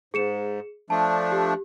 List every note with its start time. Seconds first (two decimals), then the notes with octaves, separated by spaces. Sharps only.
0.14 G#2 G#4 C#7 E7
0.90 F3 A3 D4 A5
1.32 G4